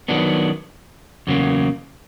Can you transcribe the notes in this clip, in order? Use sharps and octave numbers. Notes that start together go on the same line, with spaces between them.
D#3 F#3 B3 D4
E2 C#3 F#3 A#3